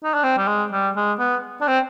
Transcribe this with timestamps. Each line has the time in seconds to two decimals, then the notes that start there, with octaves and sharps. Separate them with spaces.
0.04 D#4
0.14 D4
0.23 C4
0.38 G3
0.47 G#3
0.72 G3
0.96 G#3
1.19 B3
1.61 D4
1.67 C4